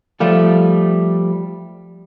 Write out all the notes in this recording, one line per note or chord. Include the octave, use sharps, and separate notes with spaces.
F3 G3 A3 F4